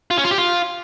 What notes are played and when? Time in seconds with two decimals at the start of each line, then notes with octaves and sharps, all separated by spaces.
0.11 F4
0.17 C#4
0.24 F4
0.31 G4
0.38 F4